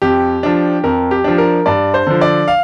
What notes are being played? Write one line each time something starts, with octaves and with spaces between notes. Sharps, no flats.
F2 G4
F3 D4
F2 A#4
G4
F3 D4
A#4
G2 D5
C5
D3 F3
D5
F5